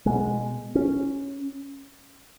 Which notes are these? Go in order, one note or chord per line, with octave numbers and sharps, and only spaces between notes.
B2 G#3
C#4